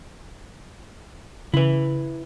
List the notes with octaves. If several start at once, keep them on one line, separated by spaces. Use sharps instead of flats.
C#3 E4 B4